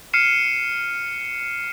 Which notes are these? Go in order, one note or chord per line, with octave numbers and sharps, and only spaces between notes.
F6 C7 C#7 D#7 E7